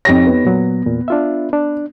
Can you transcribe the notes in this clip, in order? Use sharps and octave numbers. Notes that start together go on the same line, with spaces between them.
F2 D#4 G4 C#5 A#6
B3
A#2 F#3
E2 A#2
D4 F4 E5
D4